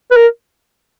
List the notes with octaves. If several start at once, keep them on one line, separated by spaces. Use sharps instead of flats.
B4
A#4